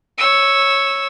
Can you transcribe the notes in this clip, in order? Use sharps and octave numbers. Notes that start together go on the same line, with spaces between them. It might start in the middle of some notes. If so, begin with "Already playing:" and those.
C#5 E6